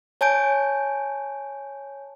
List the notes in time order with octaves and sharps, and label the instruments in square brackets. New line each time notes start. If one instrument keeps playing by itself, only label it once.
[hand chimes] C#5 G#5 A5 G6 D7